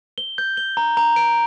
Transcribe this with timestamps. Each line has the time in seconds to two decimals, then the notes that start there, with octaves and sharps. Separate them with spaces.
0.18 G7
0.38 G6
0.57 G7
0.77 A#5
0.97 A#5
1.16 D7